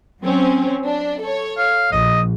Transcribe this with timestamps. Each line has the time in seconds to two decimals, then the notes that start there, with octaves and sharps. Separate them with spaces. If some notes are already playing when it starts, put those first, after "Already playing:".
0.22 F#3 C4 C#4
0.85 D4
1.21 A4 C#5
1.58 F5
1.92 A#1 D#5